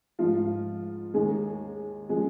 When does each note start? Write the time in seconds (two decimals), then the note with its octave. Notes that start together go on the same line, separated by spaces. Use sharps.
0.19 G#2 F3 G#3 F4
1.14 D#2 D#3 G#3 G#4
2.09 C#3 F3 G#3 G#4